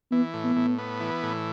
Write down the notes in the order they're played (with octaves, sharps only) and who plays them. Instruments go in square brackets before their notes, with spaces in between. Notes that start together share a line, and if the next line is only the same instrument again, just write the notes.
[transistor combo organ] E3 [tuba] B3
[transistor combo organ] A2
[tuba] B3
[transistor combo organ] A2
B3
E3
A2